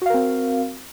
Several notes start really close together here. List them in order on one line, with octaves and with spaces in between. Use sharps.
F#4 F5 A#4 C4